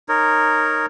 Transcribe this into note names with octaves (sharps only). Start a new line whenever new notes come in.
D#4 A#4 C#5